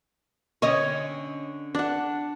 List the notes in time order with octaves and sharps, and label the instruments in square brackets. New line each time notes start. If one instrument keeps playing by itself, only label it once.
[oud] D3 C#4 D#5 [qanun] C#5
[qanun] D4 F#5